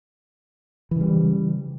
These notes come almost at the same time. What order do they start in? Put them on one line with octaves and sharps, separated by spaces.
E3 C#3 G3